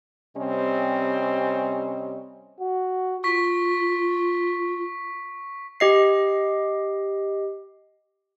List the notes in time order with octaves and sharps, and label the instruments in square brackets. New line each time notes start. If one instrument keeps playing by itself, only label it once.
[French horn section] C3 G3 C4 C#4 D#5
[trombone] F#4
[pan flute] F4 [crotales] C#6 B6
[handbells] G4 D#5 C7